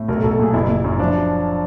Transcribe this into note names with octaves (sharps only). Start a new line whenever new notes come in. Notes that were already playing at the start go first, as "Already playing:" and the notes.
Already playing: A2
B1 A#4
A4
B1
A4
A#2 G#4
F#1 E4
F#1
F#2
F3 D4